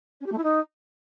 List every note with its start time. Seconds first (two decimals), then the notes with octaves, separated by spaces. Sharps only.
0.20 C#4
0.26 G4
0.32 A3
0.37 E4
0.43 D#4